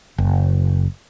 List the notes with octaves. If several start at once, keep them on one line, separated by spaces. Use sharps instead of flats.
F#1